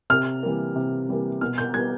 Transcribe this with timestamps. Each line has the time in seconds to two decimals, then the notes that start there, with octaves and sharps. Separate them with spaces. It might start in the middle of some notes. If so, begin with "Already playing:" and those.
0.10 C3 F6
0.43 E3 G3 A#3
0.75 C3
1.09 E3 G3 A#3
1.41 B2 F6
1.58 G6
1.74 G3 B3 G#6